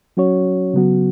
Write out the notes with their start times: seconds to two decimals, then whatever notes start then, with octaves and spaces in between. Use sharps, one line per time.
0.17 F#3 C#4 F#4 C#5
0.74 C#3 F#3 B3 F#4